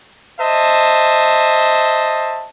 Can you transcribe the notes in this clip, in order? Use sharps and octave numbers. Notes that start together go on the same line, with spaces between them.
C5 D#5 E5 A5